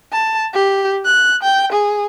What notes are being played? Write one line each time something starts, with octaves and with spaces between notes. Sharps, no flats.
A5
G4
F#6
G5
G#4